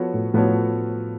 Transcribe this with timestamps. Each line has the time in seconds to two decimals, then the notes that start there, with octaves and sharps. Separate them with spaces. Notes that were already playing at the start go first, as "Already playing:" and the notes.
Already playing: F3 B3 F#4 A4 C#5
0.14 A2
0.34 A2 F3 B3 F#4 A4 C#5